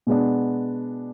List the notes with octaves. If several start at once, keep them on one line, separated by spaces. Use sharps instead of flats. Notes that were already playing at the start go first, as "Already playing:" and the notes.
B2 G#3 B3 D4